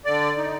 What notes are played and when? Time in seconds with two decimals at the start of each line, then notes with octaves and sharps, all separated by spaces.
0.05 D3 D5
0.37 D#4